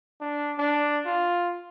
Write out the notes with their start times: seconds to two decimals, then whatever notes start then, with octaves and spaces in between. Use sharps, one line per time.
0.21 D4
0.58 D4
1.06 F4